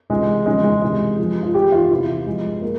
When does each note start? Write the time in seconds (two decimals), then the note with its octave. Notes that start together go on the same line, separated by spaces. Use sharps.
0.10 C#2 C3 E3 G#3
0.46 E2 C#3 F3 G#3
0.64 G#3
0.82 C#2 C3 E3 G#3
1.18 G2 F3
1.43 F4
1.54 G2 E3 G4
1.72 F4
1.90 E2 C3 E3 E4
2.27 G2 F3 G#3
2.62 A#3